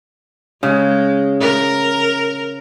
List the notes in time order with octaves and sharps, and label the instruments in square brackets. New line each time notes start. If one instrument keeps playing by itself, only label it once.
[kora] C#3 [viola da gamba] G#3
[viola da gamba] A#4